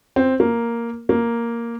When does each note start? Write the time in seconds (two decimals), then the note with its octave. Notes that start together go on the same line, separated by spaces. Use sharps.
0.16 C4
0.40 A#3
1.09 A#3